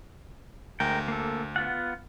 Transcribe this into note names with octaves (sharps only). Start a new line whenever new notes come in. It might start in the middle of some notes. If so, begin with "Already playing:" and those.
D2 G#3 A#4 G5
A#3 A4
B3 F4 F#5